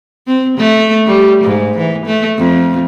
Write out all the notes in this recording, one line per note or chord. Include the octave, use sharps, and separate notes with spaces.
C4
A3
G3
G#2
E3
A3
F2